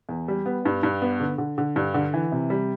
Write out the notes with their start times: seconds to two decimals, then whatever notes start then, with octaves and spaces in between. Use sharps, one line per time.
0.09 E2
0.28 G3
0.46 B3
0.65 G2
0.83 G2
1.02 B3
1.20 D3
1.38 D3
1.58 D3
1.76 G2
1.94 D3
2.14 E3
2.32 C3
2.50 G3